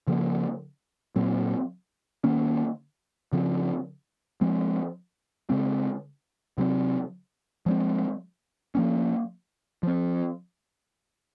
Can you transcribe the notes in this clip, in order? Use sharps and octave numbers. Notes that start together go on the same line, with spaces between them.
C#3 F3 A#3
A#2 F#3 C4
D#3 A#3 C#4
C#3 F3 C4
F3 G#3 C4
C#3 G#3 C4
C3 F#3 C4
F3 G#3 C4
F3 A#3 C#4
F3 C4